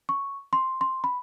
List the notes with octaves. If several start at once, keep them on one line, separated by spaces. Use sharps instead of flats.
C#6
C6
C6
B5